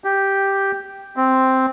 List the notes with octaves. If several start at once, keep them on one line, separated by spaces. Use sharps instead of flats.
G4
C4